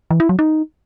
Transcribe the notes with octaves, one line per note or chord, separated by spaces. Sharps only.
E3
E4
F#3
D#4